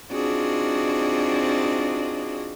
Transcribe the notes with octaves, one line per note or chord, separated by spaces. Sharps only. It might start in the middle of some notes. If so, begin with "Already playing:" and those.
C4 D4 D#4 F4 F#4 G#4